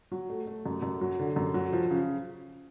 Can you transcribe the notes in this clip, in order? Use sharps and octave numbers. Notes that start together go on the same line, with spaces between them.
F#3
A3
A3
F#2
F#2
F#3
D3
F#2
F#3
F3
C#3